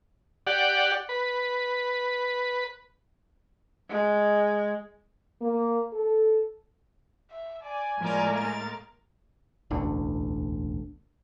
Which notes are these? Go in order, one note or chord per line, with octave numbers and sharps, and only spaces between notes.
G4 D5 F#5
B4
G#3
A#3
A4
E5
D5 G#5
A2 F3 G#3 A#3 A#4 D5
A6
E1 A1 D2 D3